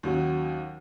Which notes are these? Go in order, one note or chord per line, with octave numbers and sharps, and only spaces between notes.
D#2 D#3 F#3 C#4 F#4